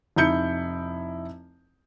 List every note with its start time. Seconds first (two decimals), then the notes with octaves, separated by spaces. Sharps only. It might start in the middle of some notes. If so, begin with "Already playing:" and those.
0.16 F1 D#4 E4 G6 C#7